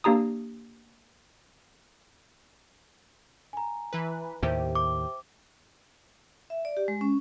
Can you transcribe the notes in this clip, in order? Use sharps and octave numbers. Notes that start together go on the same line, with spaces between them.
A#3 D4 G4 A#5 D#6
G#5 A#5
E3 B4
D#2 A2 D#3 G4 C5 E5 G5
D6
E5
D5
G4
G#3
C#4